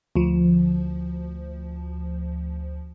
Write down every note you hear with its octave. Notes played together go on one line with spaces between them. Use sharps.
D2 F3